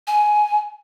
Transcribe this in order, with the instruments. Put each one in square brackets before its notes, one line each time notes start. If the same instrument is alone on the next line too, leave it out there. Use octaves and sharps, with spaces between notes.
[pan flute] G#5